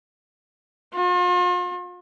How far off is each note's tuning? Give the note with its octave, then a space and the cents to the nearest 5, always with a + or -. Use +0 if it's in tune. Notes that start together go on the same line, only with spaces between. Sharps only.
F4 +40